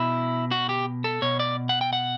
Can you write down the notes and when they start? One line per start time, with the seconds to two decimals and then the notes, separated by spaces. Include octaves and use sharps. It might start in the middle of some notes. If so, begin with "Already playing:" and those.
Already playing: B2 E4
0.51 F#4
0.69 G4
1.04 A4
1.22 B2 C#5
1.40 D5
1.69 F#5
1.81 G5
1.93 F#5